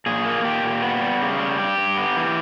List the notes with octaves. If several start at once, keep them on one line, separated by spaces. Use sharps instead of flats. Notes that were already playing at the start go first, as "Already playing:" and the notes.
A#2 G#4
A#3
A#2 G4
A#2
B3
G3
C#3
G3
G2 G4
G2
B3
E3